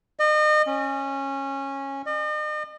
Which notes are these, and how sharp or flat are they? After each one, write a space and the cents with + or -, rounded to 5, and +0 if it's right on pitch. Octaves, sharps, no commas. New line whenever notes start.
D#5 -35
C#4 -15
D#5 -45